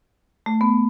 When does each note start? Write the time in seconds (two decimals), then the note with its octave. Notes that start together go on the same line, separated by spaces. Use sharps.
0.46 A3
0.61 B3